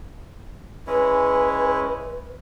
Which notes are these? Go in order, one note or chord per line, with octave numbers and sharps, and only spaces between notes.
G#3 C#4 E4 B4